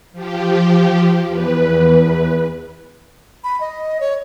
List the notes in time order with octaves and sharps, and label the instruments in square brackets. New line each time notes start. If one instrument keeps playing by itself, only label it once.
[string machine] F3 G4
E2 B4
[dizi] B5
D#5
C#5